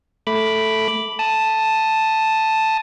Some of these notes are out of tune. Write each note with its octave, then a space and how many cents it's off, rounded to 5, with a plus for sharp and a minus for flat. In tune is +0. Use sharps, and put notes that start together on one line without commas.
A3 +0 B5 +0 D6 -5
A5 +0 D#6 +0